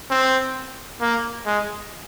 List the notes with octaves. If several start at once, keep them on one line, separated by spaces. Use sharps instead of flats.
C4
A#3
G#3